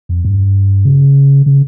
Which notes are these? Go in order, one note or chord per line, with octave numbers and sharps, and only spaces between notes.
F2
G2
C#3
C#3